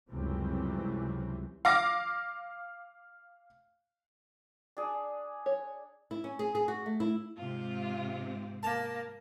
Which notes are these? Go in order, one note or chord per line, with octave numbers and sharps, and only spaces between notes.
C#2 F#2 C3 E3 G3 C4
F5 D6 A#6
D4 G#4
C#5
E4
C#4
G#4
G#4
F#4
A3
E4
G#2 C3 C4 F4
A#3 A5